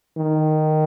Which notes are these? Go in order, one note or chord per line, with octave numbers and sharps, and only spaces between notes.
D#3